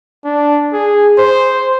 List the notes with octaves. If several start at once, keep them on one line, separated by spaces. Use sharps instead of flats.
D4
G#4
C5